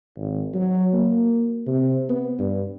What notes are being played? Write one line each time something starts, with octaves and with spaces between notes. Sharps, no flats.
G#1
F#3
A#3
C3
B3
G2